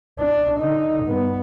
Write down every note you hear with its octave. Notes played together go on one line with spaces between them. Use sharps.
D4
D3 D#4
G2 B3